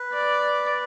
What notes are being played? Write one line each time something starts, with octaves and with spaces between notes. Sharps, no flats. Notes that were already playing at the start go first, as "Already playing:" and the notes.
Already playing: B4
D5